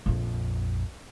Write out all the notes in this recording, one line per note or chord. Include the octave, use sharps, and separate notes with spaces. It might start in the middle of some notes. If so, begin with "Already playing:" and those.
A#1 F2